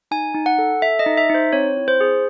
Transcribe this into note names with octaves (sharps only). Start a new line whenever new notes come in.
D#4 G#5
D#4
F#5
A4
A4 E5
D#5
D#4
E5
D#4 C5
C4 C#5
E4
C5
G#4